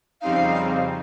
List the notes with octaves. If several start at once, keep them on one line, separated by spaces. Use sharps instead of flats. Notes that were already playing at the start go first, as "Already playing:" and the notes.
F2 C#3 G3 C4 D#4 F5